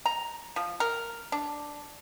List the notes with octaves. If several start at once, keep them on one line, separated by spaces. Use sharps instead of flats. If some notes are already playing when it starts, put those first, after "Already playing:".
A#5
F3
A#4
D4